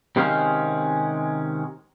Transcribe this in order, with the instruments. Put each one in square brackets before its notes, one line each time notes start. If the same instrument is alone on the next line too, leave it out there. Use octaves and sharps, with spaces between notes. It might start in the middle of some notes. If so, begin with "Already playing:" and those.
[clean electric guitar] C3 D#3 G#3 C#4 C5 F5